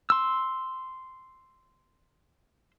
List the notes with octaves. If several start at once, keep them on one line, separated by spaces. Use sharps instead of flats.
C6 E6